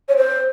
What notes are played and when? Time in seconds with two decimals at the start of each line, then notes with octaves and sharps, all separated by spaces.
0.09 C#5
0.17 C5